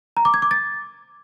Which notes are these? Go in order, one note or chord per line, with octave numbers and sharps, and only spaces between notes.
A#5
D6
G#6
D6
A6